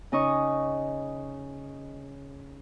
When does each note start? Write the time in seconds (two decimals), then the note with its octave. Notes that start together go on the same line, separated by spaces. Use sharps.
0.12 C#3 C#4 D#4 D#5 C#6 D#6